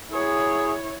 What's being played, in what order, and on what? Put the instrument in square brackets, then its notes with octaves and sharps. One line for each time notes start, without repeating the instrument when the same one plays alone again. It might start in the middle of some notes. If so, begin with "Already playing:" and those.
[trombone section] F#3 G#4 [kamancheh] E4 C#5